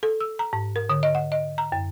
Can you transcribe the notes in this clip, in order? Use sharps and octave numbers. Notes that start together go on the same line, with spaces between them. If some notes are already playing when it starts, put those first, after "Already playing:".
A4
E6
A#5
G#2
A#4
D3
D#5
F#5
D#5
A#5
F#2